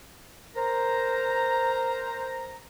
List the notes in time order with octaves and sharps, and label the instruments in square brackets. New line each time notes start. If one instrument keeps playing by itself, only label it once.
[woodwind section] A#4 C5 A#5